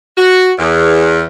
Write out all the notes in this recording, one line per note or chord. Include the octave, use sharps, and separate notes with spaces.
F#4
E2